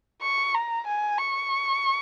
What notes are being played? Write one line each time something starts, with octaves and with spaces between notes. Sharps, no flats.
C#6
A#5
G#5
C#6